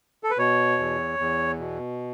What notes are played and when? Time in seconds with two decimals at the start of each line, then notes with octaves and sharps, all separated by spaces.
0.24 A4
0.30 B4
0.38 B2 C#5
0.79 E2
1.19 E2
1.59 B2